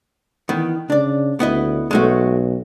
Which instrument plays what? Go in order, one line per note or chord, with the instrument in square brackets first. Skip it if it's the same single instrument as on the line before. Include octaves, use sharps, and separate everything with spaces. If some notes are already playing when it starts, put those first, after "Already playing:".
[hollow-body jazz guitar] D#3 B3 [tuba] E3
[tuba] C#3 [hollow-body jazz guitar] D4 D5
[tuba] D2 [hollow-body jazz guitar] B3 E4 D#5
[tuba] B1 [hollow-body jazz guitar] G#3 A3 F#4